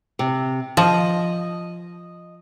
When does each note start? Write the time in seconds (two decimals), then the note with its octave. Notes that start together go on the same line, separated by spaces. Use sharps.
0.19 C3
0.77 F3 D#5